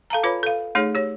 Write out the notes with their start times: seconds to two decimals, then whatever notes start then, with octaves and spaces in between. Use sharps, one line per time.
0.10 A4 F5 A5 A#5
0.23 F4 B4 C#5 B5
0.43 A4 F5
0.75 A3 D#4 G#4 C#5
0.95 G4 C#5